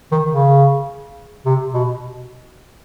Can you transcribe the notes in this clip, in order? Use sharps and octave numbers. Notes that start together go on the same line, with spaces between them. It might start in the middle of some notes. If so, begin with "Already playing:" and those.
D#3
C#3
C3
B2